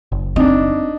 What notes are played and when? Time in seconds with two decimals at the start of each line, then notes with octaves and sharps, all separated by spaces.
0.12 F#1
0.36 C4 D4 D#4